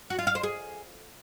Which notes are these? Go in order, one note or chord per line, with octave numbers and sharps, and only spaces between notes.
F#4
F4
F5
C5
G#4